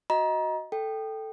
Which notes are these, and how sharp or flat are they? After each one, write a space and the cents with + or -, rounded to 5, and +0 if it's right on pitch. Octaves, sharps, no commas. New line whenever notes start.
F#4 +0 D#5 +15 A#5 +25
A4 +0 G5 +0